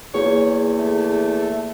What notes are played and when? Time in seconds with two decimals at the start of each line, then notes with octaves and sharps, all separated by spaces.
0.14 E2 A#3 F4 G#4 C#5
0.79 A3